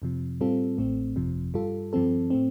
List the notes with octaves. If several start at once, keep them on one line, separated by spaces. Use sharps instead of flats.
F2 C3 F3
A2 G3 C4 F4 A4
A1 A2 A3 C4
G1 F2 C3 F3
G2 G3 F4 A4
G2 F3 C4 A4
A2 A3 C4